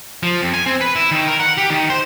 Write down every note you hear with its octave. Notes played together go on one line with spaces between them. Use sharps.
F3
F2
G#5
C4
B4
E4
D#3
A#4
F#5
G4
D#3
C5